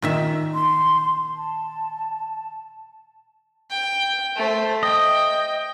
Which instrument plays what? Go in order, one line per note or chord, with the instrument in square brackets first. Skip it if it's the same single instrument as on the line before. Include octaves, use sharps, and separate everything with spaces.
[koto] A#2 D#3 E5
[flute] C6
A5
[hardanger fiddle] G5
A3 C5
[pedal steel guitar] D#5 [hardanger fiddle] G5